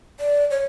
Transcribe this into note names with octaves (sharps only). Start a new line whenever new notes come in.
D5
C#5